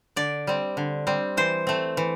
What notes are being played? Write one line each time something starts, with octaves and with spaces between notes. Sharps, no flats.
D3 D5
G3 C4
D3
G3 C4
E3 C5
A3 C4
E3